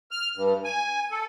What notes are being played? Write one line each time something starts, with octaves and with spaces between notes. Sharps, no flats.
F6
G2
G#5
A4